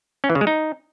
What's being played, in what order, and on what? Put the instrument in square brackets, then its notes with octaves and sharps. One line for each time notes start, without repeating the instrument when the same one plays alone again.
[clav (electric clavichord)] C#4
E3
C#3
G#3
D#4